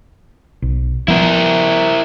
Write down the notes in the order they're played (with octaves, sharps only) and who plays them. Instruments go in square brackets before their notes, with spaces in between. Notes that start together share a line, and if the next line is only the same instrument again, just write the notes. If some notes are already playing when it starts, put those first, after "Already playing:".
[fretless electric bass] B1
[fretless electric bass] F3 B3 [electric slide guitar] E4 A#4